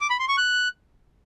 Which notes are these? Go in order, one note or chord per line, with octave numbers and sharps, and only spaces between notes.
D6
B5
C6
C#6
F#6